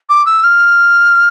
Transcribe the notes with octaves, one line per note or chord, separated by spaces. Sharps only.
D6
E6
F6